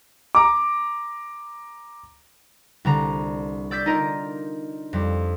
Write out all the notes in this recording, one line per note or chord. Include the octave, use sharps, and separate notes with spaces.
A#5 D6
C2 D3 A#5
D5 E6 G6 A6 B6
D4 D#4 F4 A#4 D#5 A#5
F2 G3